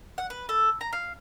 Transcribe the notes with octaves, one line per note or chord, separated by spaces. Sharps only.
F#5
B4
A4
A#5
F5